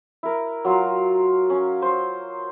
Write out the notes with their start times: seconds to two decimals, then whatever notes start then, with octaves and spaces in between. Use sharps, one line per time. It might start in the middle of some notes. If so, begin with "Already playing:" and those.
0.23 E4 A#4
0.65 F#3 F4 F5
1.50 C#4
1.82 C5